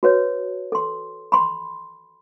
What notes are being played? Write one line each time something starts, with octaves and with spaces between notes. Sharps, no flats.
F#4 B4 C#5
A4 C6
B5 C6